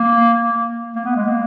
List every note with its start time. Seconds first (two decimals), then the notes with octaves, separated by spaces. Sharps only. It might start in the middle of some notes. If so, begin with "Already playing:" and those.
Already playing: A#3
0.95 A#3
1.05 B3
1.16 G#3
1.26 A#3